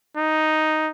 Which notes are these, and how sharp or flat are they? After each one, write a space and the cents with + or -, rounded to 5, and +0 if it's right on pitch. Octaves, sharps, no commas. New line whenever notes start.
D#4 +0